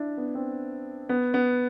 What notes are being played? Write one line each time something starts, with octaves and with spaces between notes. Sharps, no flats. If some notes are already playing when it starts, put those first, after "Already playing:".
Already playing: D4 E4
B3
C4
B3
B3